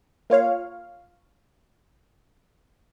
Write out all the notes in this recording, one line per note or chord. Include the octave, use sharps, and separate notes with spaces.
A#3 F4 C#5 F5